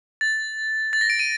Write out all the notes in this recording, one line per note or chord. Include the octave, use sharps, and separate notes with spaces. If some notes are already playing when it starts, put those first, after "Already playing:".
A6
A6
A#6
D7
D#7